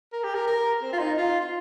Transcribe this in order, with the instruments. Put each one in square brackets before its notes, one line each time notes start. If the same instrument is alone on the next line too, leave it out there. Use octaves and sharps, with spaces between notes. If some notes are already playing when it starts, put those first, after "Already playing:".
[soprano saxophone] A#4
G4
A#4
A#4
C4
F4
D#4
F4
F4